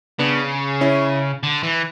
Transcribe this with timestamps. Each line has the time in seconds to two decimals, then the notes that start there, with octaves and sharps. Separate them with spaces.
0.19 C#3 B3 D4
0.81 C#4 E4
1.43 D3
1.63 E3